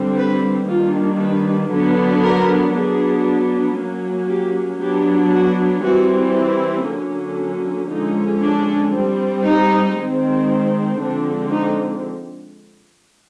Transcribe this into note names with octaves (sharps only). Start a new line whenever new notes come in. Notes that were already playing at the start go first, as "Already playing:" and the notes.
Already playing: D3 G3 C4
B4
D#3 G3 A#3 D4 F4
B4
D3 F#3 B3 D4
A#4
F#3 B3 D4 G#4
F#3 A#3 C#4
G4
F#3 B3 D4 G4
F#4
E3 G3 C4 F#4
E4
D3 F#3 A#3 C#4
D3 F3 G#3 C#4 D#4
D4
G3 C4
D#4
D#3 G#3 C4
D3 F3 G#3 C4 D4
D#4